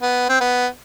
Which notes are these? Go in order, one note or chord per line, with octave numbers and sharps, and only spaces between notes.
B3
C4
B3